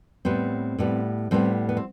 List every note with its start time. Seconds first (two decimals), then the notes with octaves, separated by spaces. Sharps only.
0.25 A2 G3 B3 C4
0.79 A2 G3 B3
1.31 A2 G3 B3 C4
1.69 B3
1.77 C4